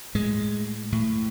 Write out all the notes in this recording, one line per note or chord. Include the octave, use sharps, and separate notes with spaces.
A2 G#3
A2